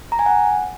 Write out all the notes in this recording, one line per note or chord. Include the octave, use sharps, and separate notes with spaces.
A#5
G#5
F#5